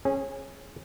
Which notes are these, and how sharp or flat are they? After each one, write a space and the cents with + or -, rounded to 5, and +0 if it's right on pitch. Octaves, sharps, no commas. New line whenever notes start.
C#4 -25 G#4 +0